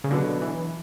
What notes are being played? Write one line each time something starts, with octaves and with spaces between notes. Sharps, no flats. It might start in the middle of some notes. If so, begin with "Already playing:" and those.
C#3
B2 D3 F#3 B3 D4
E3